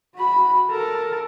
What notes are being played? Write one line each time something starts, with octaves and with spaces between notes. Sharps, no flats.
F#4 B5
A4 A#4